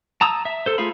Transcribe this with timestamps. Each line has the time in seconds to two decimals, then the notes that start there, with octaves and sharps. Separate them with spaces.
0.21 A5 A#5 D#6 E6
0.45 E5
0.66 A4 C5
0.78 A3 F4 G#4 F5 B5